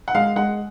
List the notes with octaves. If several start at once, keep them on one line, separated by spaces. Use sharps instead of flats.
F#5
G#3 F5
G#3 F#5